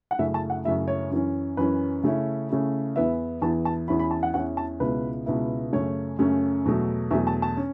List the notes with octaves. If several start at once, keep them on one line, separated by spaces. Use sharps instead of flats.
F#5
F#2 C#3 A3 E4 E5
A5
F#5
F#2 C#3 A3 E4 E5
C#5
F#2 E3 C#4
F#2 E3 C#4 B4
C#3 A3 C#4 E4
C#3 A3 C#4 E4
E2 E3 B3 E4 E5
E2 E3 B3 E4 A5
A5
E2 E3 C#4 E4 B5
B5
A5
F#5
E2 E3 C#4 E4 F#5
A5
C#2 B2 B3 E4 B4
C#2 B2 B3 E4
F#2 C#3 A3 C#4 C#5
F#2 C#3 A3 C#4
E2 B2 F#3 A3
E2 B2 F#3 A3 E5
A5
A5
C#4